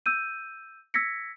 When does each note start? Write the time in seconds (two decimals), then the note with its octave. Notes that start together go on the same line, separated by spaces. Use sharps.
0.06 E6 G6 D#7
0.94 E6 G#6 A#6 B6 C#7